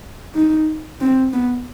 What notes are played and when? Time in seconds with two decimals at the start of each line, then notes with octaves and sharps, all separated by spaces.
0.35 D#4
1.01 C4
1.33 B3